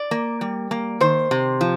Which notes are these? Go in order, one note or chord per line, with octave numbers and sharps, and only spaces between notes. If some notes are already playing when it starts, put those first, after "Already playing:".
Already playing: D5
A#3
G3
A#3
D#3 C5
C3
F3